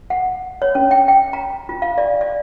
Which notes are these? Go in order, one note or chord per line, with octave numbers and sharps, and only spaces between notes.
F#5
C#5
C#4
G5
G5
A#5
F4
F5
D5
D5